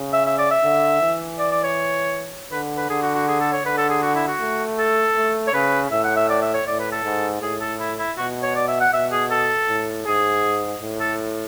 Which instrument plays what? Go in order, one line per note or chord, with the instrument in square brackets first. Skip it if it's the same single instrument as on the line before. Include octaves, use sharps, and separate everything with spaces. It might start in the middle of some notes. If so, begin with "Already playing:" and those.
Already playing: [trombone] C#3
[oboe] E5
E5
D5
E5
[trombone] D3
E3
[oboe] D5
D5
C#5
[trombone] D3 [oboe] B4
[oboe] B4
[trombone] D3 [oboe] G#4
[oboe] F#4
F#4
G#4
A4
C#5
[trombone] D3 [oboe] B4
[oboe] A4
G#4
F#4
E4
F#4
[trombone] A3
[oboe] A4
[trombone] A3
[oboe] C#5
[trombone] C#3 [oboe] B4
[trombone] A2 [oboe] E5
[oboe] F#5
E5
D5
E5
C#5
[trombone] A2 [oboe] D5
[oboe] B4
A4
[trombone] G#2
[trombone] A2 [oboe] G#4
[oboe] A4
E4
E4
[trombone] B2 [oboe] F#4
[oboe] C#5
D5
E5
F#5
[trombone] B2 [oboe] E5
[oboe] G#4
A4
[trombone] A2
[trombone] G#2 [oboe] G#4
[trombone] A2
[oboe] A4